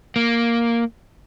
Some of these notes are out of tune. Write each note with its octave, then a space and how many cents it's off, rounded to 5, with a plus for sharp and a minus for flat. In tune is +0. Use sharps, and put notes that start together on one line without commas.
A#3 +0